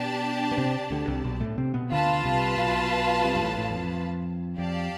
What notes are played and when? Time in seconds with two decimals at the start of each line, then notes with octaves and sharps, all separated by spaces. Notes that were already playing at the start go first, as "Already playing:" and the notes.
Already playing: B2 B3 D4 G4 D5 A5
0.52 B3
0.57 C3 C4
0.91 D2 D3
1.07 C2 C3
1.24 B1 B2
1.41 A2 A3
1.58 C3 C4
1.74 B2 B3
1.91 D2 D3 F4 B4 F5 A5
2.24 C2 C3
2.57 B1 B2
3.24 C2 C3
3.36 G2
3.41 A1 A2
3.57 A1 A2
3.70 E2
3.75 F2
4.58 F2 G4 D5 F5 A5